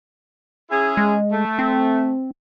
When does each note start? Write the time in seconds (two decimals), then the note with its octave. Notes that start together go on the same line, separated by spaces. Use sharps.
0.70 C#4 E4 G#4
0.97 G#3
1.31 A3
1.59 C4